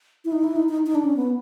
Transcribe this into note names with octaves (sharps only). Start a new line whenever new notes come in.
E4
D#4
E4
D#4
D#4
D#4
D4
C#4
B3